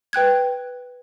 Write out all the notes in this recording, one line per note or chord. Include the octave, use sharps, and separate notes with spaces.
B4 G5 F#6 G#6